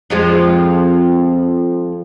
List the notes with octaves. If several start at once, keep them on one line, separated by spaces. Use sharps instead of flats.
F2 F3 G#3